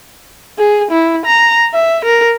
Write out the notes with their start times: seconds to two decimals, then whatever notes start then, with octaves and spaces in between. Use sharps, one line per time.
0.58 G#4
0.91 E4
1.26 A#5
1.74 E5
2.05 A#4